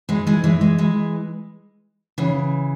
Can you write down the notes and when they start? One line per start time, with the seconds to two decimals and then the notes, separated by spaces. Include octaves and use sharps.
0.09 E3 G#3
0.27 E3 G#3
0.44 E3 G#3
0.61 E3 G#3
0.78 E3 G#3
2.18 C#3 E3